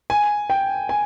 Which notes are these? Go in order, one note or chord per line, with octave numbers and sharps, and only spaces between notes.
G#5
G5
G#5